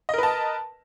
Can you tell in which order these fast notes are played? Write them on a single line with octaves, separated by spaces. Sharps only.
D#5 A#4 B4 A5